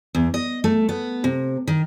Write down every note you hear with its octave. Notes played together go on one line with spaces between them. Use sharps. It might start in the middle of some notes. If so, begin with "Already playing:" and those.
E2
D#5
A3
B3
C3
D#3